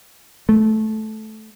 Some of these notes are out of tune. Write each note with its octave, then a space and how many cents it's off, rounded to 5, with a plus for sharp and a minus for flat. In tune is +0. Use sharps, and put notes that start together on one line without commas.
A3 -15